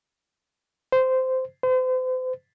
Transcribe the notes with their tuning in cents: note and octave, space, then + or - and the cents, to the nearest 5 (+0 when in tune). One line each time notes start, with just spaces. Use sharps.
C5 -15
C5 -40